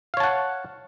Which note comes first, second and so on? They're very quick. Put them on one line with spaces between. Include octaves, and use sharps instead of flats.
F5 C#5 A5 F#5